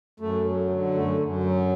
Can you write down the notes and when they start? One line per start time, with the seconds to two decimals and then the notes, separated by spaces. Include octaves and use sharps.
0.20 F#2 A3
0.45 F#3
0.69 D3
0.94 F#2 A3
1.19 F#2
1.43 F#3